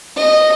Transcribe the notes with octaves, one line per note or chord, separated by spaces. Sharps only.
D#5